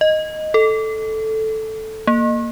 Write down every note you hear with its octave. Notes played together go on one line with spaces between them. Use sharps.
D#5
A4
A#3